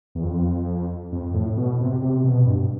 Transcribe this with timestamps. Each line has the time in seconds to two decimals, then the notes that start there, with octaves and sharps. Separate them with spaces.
0.15 E2
0.23 F2
1.12 F2
1.34 A2
1.57 B2
1.80 C3
2.02 C3
2.24 B2
2.46 G2